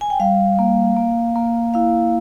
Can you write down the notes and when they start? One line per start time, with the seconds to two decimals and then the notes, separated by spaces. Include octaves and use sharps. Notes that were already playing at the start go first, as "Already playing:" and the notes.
0.01 G#5
0.10 G5
0.20 G3 F5
0.59 A#3
0.97 A#3
1.36 A#3
1.74 E4 F5